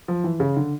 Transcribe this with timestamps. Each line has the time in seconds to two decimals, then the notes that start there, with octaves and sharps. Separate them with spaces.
0.08 F3
0.24 E3
0.40 C#3
0.57 D3